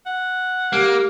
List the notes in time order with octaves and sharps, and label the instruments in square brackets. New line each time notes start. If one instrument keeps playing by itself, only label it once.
[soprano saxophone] F#5
[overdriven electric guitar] A#3 [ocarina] G4